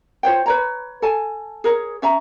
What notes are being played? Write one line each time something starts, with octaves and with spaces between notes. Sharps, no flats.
F4 C5 C#5 G5
B4 C#5 A#5
A4 G#5 A5
G#4 A#4 C#5
C#4 E5 A#5